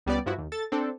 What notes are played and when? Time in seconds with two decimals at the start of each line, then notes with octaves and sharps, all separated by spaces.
0.06 C#2 G3 B3 D5
0.26 G2 F3 E4 F#4
0.38 D#2
0.52 A4 A6
0.72 C4 D4 A4